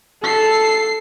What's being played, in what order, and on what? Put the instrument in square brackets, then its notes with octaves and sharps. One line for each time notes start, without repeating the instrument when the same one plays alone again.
[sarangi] A4 [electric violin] C7